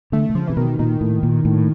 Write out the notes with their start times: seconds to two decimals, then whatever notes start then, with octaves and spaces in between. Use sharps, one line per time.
0.12 D3 A3
0.30 D3
0.34 C#3 F3
0.47 C3 E3
0.57 B2 D#3
0.79 A#2 D#3
1.01 A2
1.23 A#2
1.45 A2